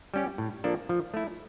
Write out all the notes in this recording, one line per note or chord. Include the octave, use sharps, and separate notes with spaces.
G3 C#4 G4
A2
F3 A#3 D4 A4
F3
A3 E4